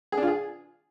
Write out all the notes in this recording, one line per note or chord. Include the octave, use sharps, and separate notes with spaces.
G#4
D4
F4
G#4